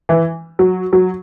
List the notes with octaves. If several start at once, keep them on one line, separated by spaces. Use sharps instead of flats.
E3
F#3
F#3